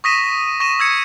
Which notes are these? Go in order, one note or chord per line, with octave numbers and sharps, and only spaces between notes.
C#6 D#6 A#6 B6 D#7 E7
C#6 A#6 D#7 E7
E6 G#6 C#7